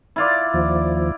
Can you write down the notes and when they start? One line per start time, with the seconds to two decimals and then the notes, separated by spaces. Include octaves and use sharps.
0.16 E4 F4 D5
0.54 D#2 F3